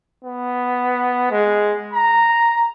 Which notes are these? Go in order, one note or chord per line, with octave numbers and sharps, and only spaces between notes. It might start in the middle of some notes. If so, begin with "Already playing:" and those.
B3
G#3
A#5